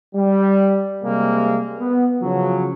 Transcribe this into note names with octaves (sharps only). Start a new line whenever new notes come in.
G3
C3 G3 G#3 A#3
B3
C#3 F3 F#3